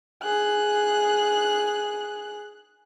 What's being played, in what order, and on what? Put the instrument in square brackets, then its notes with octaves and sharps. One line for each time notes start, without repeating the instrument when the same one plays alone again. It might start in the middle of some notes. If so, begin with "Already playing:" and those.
[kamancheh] G#4 F#6